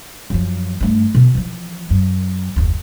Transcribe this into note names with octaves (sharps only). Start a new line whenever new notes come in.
F#2 F3
G2 A3
B2 D3
E3 F3
F#2
F#1 D#2